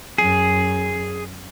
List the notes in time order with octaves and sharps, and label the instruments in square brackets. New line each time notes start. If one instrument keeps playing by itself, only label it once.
[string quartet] F#2 [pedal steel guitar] G#4